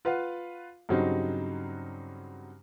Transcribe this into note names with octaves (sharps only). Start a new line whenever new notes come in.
F4 B4 F5 F#5
G2 C#3 F#3 C4 D#4